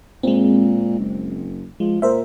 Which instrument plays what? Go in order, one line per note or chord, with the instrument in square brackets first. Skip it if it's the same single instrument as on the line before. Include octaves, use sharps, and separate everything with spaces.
[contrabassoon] A#2 [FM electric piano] G#3 C4
[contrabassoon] F#1
[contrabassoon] F3 [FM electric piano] G#3
[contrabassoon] A#2 [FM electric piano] A#4 C5 E5